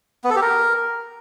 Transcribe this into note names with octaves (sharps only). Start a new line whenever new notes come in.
B3
A4
G4
A#4